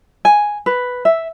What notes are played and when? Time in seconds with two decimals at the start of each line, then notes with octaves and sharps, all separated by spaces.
0.25 G#5
0.66 B4
1.05 E5